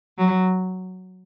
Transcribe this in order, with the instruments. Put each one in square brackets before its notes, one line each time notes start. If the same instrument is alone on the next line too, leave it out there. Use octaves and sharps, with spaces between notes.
[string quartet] F#3